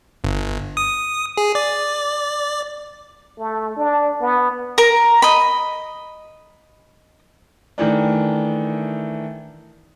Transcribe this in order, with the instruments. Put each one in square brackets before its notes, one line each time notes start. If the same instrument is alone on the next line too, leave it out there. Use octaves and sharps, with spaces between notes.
[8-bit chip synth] G1
D#6
G#4
D5
[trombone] A3
D4
B3
[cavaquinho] A#4 A#5
D#5 B5
[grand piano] D#3 E3 A3 D4